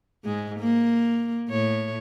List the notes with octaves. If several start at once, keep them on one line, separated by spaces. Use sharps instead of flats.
G#2 G#3
A#3
A2 C#5